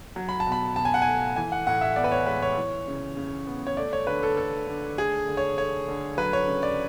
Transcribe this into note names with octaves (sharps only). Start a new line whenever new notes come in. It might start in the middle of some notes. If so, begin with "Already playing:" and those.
F#3
B5
A5
B2
B5
B2 A5
G#5
F#5
A3 G#5
E3 G#5
F#5
A2 F#5
E5
B3 D5
B4
C#5
G#3 B4
C#5
E3
C#3
C#3
B3
C#5
A3 D5
C#5
D3 B4
A4
A3 A4
D3
A3 G#4
D3
C#5
A3 C#5
D3
F#3 B4
C#5
C#3
D5